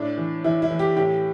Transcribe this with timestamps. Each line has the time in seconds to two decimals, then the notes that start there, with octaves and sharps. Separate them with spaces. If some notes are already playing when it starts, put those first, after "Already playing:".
Already playing: A2 D4
0.18 E3
0.44 E3 E4
0.62 E4
0.71 E3
0.79 G4
0.96 A2 G4